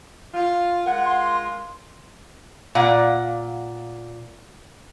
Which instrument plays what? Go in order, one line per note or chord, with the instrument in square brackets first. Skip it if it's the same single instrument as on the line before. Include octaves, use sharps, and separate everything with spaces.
[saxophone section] F4
[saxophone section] G#3 F4 A#4 [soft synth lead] F#5
[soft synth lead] C6
[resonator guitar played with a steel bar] A#2 [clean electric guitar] F5 F#5